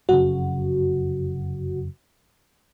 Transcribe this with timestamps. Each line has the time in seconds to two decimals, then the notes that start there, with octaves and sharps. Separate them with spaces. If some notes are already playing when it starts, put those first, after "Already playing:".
0.09 F1 F#2 C#3 F#4